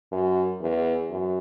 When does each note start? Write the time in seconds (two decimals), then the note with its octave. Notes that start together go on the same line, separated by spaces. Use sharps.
0.12 F#2
0.61 E2
1.10 F#2